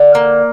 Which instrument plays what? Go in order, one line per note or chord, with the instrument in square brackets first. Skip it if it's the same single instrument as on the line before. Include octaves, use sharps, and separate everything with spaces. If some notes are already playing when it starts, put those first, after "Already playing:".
Already playing: [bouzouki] D3
A#3